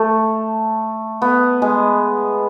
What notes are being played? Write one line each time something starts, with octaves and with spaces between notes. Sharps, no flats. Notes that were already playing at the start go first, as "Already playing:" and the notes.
Already playing: A3
B3
G#3